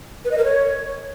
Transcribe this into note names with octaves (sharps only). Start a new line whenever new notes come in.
B4
D#5
A#4
C#5